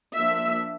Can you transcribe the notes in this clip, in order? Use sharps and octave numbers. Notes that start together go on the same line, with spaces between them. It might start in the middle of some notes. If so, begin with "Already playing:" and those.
F3 A#3 D4 E5